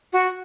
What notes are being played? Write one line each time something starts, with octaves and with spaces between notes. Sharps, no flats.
F#4